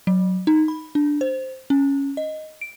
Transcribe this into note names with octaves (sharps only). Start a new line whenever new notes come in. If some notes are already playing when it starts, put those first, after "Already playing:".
F#3
D#4
B5
D4
C5
C#4
D#5
D7